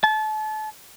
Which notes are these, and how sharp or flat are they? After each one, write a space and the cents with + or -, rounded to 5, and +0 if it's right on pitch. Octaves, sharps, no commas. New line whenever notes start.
A5 -30